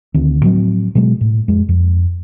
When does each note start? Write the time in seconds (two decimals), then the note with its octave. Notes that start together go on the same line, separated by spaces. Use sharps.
0.14 D2 D#3 C4
0.42 A2 F3 F#3 C4
0.95 B2 F#3 G#3
1.21 A2
1.48 F2 G#3
1.69 F2